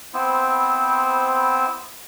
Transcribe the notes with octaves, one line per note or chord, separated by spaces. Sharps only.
B3 C4 E4 C5